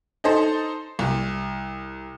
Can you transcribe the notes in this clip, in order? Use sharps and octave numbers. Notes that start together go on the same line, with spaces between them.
D#4 A4 C5
C2